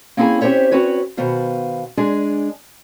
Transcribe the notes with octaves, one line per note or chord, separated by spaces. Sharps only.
A#3 C4 C#4 E4 G#4 G#5
C4 C#4 G4 C5 C#5 E5
C4 C#4 F#4 B4 C#5
B2 D#3 B3 C5 F5
G#3 D4 G#4 G#5